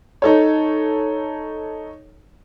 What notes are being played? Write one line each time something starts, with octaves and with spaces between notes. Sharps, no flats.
D#4 A4 C#5